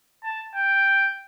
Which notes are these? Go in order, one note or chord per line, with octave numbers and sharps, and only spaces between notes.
A5
G5